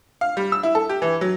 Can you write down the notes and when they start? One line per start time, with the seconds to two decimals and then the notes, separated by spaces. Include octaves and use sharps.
0.21 F5
0.37 G3
0.52 E6
0.63 E4
0.75 A4
0.89 G4
1.02 E3
1.21 F#3